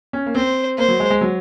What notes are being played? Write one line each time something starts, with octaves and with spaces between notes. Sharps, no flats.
C#4
A#3
C4 C5
A#3 C5
F#3
G#3
G#3
F#3